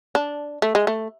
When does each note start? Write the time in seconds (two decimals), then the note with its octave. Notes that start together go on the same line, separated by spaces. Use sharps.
0.15 D4
0.62 A3
0.75 G#3
0.87 A3